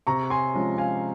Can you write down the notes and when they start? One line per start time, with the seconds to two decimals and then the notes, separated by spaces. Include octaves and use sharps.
0.07 C3 A#5 C#6
0.30 G#5 C6
0.54 F3 G#3 C#4
0.78 F5 G#5